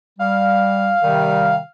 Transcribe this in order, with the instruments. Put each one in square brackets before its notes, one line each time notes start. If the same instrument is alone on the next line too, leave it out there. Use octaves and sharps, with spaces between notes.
[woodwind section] G3 [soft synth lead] F5
[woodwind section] C3 D#3 G3